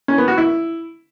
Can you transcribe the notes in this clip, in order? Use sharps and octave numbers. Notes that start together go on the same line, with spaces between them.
C#4
B3
F#4
E4